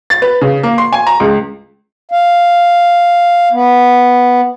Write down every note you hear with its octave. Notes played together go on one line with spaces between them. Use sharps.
A6
B4
C#3
A#3
C6
G#5
A#5
C#2
F5
B3